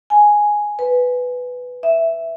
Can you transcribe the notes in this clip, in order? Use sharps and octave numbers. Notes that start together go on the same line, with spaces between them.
G#5
B4
E5